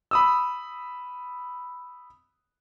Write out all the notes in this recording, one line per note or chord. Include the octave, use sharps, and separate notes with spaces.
B5 D#6 E6